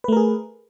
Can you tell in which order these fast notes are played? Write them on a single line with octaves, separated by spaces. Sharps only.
B4 A3 A#4 G#4